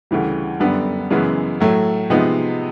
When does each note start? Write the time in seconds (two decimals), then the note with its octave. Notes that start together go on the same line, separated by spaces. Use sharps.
0.11 D2 C#3 E3 G3
0.60 F#2 D3 G3 B3 D4
1.10 F#2 C#3 E3 G#3 B3
1.60 A2 F#3 A3
2.10 C3 F3 G#3 B3 D#4